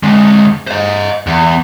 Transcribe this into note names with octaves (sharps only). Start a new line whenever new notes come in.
D3 G#3
C5 D#5
E2